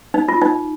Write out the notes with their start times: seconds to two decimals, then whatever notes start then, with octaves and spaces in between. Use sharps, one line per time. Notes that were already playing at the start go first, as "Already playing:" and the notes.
0.14 D#4
0.28 F4
0.42 D#4